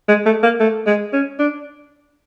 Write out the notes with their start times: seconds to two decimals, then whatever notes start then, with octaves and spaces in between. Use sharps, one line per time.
0.09 G#3
0.26 A3
0.43 A#3
0.60 A3
0.86 G#3
1.13 C#4
1.39 D4